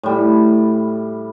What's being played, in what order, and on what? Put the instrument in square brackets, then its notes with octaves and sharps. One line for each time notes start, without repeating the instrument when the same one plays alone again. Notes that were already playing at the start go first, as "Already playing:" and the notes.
[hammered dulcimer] A2 G3